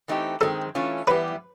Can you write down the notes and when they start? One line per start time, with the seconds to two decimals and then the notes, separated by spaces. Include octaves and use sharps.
0.08 E3 A3 C4 D#4 G4
0.41 D#3 G#3 C4 A4
0.75 E3 A3 C#4 F4
1.07 E3 G3 B3 E4 G4 B4